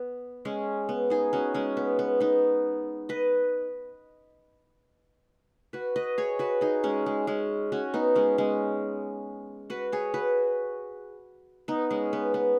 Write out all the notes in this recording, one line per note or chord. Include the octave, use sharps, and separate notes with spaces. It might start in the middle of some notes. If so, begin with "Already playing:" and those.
Already playing: B3
G#3 C#4
B3
D#4 G#4
C#4 F#4
G#3 C#4
B3
B3
B3 D#4
B4 D#5
F#4 B4
B4 D#5
G#4 C#5
F#4 B4
D#4 G#4
G#3 C#4
G#3
G#3 C#4
C#4 F#4
B3 D#4
G#3 C#4
G#3 C#4
F#4 B4
G#4 C#5
F#4 B4
B3 D#4
G#3 C#4
B3
B3